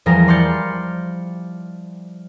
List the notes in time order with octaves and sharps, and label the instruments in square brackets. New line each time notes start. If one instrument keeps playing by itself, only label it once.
[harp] E2 F3 G3 G#3 A#4 A#6
D5 C6 F6 G6 A6 C#7